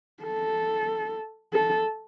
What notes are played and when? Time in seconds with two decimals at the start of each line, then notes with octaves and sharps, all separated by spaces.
0.23 A4
1.53 A4